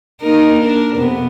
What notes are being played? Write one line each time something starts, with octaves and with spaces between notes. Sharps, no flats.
A#3 D#4 A#4
D4 A#4
F2 C3 B3